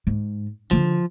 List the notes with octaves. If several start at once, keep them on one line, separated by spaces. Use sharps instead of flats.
G#2
D3 F3 C#4